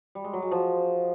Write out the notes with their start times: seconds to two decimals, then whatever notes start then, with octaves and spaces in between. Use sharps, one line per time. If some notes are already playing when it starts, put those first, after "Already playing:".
0.15 G3
0.24 G#3
0.33 F#3
0.42 G#3
0.51 F3